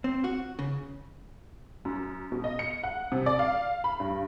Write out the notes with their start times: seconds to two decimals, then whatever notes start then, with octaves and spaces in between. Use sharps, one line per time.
0.04 C4
0.24 F#4
0.59 C#3
1.85 F#2
2.32 B2
2.44 D#5
2.59 C#7
2.83 F#5
3.12 C3
3.26 D5
3.39 F5
3.84 B5
4.00 G2